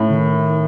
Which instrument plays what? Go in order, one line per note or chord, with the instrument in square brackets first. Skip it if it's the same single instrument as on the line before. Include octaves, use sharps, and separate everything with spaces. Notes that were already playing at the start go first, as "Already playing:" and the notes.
Already playing: [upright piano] A2
[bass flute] D3
D#3